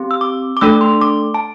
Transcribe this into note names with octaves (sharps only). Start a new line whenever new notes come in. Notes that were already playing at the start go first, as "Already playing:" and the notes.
Already playing: C4 G4
E6
D6
D6
A3 D4 A4 E6
C6
D6
A5